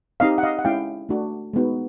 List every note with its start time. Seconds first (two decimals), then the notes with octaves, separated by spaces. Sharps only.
0.20 C4 D#4 G4 D#5 F5
0.38 F#5
0.43 D#5 F5
0.59 F#5
0.65 G#3 C#4 E4 F5 G5
1.09 A3 D4 F#4
1.53 G#3 B3 D#4 F#4